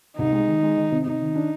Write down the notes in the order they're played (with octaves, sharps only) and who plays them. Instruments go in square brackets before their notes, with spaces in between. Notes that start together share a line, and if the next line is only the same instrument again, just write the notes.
[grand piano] C2 [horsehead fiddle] D#4
[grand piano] G#3
D#3
G#3
D#3
C3
[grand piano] C3 [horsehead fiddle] D#4
[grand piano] D#3
D4